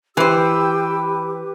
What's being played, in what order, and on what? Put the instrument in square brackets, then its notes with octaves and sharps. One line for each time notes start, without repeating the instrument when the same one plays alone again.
[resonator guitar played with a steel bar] E3 C5 [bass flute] G4 [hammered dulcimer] B4 [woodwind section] G5 E6